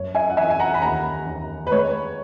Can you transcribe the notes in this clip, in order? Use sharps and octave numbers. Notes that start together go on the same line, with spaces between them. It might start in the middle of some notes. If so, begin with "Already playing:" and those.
Already playing: F#2 C#5
E5 G#5
F#5
E3 E5 G#5
G#5
F#5 A#5
B5
D#2 F#5 A#5
D#2
B4
G#3 C#5